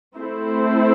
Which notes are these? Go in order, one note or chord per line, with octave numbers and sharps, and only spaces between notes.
A3 C4 E4 A4 C5